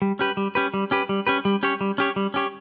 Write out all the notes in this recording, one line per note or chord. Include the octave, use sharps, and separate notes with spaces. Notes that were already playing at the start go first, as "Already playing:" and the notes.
G3
C#4 G4 B4
G3
C#4 G4 B4
G3
C#4 G4 B4
G3
C#4 G4 B4
G3
C#4 G4 C#5
G3
C#4 G4 C#5
G3
C#4 G4 C#5